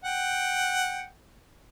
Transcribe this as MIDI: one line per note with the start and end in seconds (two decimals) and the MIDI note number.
0.04 1.08 78
0.04 1.08 79